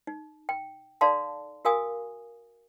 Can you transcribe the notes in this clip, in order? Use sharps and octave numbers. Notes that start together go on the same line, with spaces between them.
D#4
G5
D#4 A4 D5 F5 A5 C6
F#4 A#4 F5 G#5 D#6